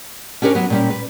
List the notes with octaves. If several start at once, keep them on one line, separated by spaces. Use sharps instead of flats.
C#4 D4 G4 A#4 C#5
F#3 B3
A#2 G3 C#4
B4